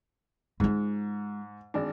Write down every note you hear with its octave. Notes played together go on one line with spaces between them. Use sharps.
G#2 G#3 F4
G#1 D4